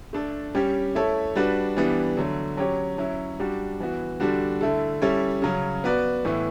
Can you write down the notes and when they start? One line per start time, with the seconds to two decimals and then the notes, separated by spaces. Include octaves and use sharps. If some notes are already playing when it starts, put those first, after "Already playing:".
0.13 A3 D4 A4
0.55 G3 C#4 G4 C#5
0.95 A3 E4 A4 C#5
1.36 G3 D4 F#4 B4
1.77 E3 G3 B3 D4
2.17 D3 F#3 A3
2.57 F#3 C#4 G4 C#5
2.98 F#3 C#4 E4
3.40 G3 D4 F#4
3.80 E3 B3 F#4
4.20 D3 G3 D4 F#4
4.61 D3 A3 E4 A4
5.02 G3 C#4 E4 A4 C#5
5.42 C#3 F#3 C#4
5.84 B3 F#4 B4 D5
6.25 A2 E3 B3 E4